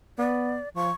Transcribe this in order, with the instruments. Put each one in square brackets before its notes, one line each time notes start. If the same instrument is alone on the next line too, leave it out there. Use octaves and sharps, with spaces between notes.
[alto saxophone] B3 [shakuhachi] D5
[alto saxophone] F3 [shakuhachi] C#6